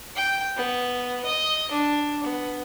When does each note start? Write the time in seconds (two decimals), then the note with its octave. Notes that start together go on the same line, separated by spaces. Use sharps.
0.16 G5
0.57 B3
1.25 D#5
1.71 D4
2.24 B3